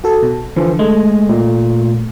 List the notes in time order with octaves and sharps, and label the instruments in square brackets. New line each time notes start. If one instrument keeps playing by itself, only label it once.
[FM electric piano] F#4 A4
B2
[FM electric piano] D3 [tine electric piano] E3 F3
[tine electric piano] G#3 [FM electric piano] A3
[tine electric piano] A#2